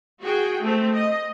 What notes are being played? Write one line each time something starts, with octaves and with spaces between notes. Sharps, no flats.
F#4 G#4 G5
A3 C4
D#5